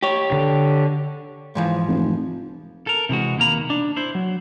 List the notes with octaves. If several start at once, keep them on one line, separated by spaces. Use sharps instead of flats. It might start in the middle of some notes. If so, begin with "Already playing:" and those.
G4 C#5
D3
G#2 E3 F3
F1
A4 A#4
C3 E3 G#3 F#4
D#2 B2 A#3 A#5 B5
D4
E4 C5
F#3